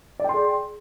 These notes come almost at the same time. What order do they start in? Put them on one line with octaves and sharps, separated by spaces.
D5 G5 C6 G#4